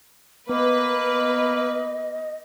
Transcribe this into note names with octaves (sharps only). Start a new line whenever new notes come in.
A#3 B3 B4 D#5